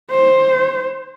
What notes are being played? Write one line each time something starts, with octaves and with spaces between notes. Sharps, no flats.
C5